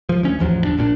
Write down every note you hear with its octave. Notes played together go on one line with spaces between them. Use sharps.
F3
D2 C#4
A1 E2 F3 F#3
G1 D4
A#1 A#2 C#4 D4